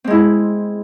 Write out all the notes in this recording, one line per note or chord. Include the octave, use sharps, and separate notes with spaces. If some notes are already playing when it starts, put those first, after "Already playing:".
G#3 C4 E4